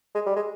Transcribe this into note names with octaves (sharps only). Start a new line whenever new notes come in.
G#3
G3
G#3